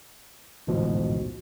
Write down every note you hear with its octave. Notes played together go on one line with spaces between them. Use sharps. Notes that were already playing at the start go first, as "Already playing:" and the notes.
A1 D2 G#2 B2 F3